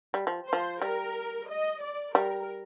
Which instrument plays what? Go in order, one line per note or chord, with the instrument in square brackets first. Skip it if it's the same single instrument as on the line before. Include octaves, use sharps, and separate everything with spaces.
[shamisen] G3
F3
[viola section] C5
[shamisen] F3
[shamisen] G3 [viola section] A#4
[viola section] D#5
D5
[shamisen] G3 [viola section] A#4